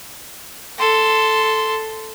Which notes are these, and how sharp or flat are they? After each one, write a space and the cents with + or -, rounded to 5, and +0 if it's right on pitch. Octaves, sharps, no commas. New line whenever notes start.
A4 +0 C6 -5